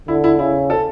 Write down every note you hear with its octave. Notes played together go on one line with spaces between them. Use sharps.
D3 E4
E4
C#3 E4
A4